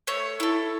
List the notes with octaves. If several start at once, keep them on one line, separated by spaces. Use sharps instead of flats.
A3 C#5
E4 A4